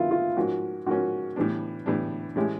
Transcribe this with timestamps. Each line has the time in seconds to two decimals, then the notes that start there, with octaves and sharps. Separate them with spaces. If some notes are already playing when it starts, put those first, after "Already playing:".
Already playing: G2 D#3 F#3 B3 E4 F4
0.11 F4
0.37 G#2 F3 A#3 C#4 F#4
0.86 G#2 F3 A#3 C#4 F#4
1.36 A2 E3 G3 B3 D4
1.86 A2 E3 G3 B3 D4
2.36 A2 E3 G#3 C#4 E4 G4